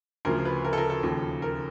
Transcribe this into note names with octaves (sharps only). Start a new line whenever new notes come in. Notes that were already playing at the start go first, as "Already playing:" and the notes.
D2 C#3 F3 A#4
B4
A#4
A4
A#4
A4
D#2 C#3 F3
A#4